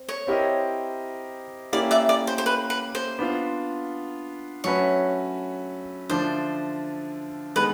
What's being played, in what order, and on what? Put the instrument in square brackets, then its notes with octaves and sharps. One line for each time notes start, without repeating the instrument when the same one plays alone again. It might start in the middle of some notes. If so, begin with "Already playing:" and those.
Already playing: [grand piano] C4
[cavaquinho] C#5
[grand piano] C4 E4 G4 A#4 D#5
[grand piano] A#3 C#4 E4 G4 [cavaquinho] D5
[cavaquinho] D5 E5
D5
C5
C5
B4
B4
C5
[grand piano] B3 D4 F4
[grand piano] F#3 A3 C#4 F#4 B4 [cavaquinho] C#5
[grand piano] D3 F3 A3 D4 [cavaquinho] C5
[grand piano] D#3 G#3 B3 D#4 [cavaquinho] B4